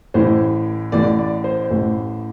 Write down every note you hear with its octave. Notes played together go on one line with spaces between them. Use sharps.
A1 A2 E3 C5
A1 A2 E3 D5
D5
C5
A1 A2 E3